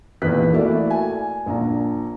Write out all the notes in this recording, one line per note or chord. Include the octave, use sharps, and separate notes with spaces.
A#1 E2 D#3 B4 F#6 B6
A3 A#3 E4 F#4 D5 E5
G#5
A#1 D4 A#5